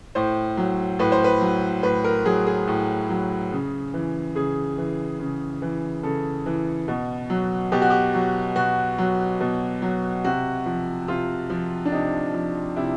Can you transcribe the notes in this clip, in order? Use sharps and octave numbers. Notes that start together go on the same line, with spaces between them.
A2 C5
F#3
A2 B4
C5
B4
F#3
A2 B4
A#4
F#3 G#4
G#4
A2
F#3
C#3
E3
C#3 G#4
E3
C#3
E3
C#3 A4
E3
B2
F#3
B2 G4
F#4
G4
F#3
B2 F#4
F#3
B2
F#3
C3 F#4
F3
C3 F4
F3
D4
C3 D#4
F3
C3 E4